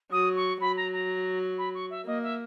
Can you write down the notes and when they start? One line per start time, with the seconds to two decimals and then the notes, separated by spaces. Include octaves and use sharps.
0.12 F#3 D#6
0.36 C#6
0.61 F#3 B5
0.77 A#5
0.93 A#5
1.58 B5
1.75 C#6
1.90 E5
2.06 A#3 D#5
2.23 E5